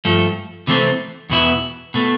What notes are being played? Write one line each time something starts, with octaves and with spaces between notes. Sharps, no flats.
G2 F3 A3
C3 E3 A3 C4
E2 B2 B3 E4
B2 A3